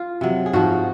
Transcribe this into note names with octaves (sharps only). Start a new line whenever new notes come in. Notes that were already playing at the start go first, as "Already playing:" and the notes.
Already playing: F4
C3 F#3
G#4
G#2 F3 F#4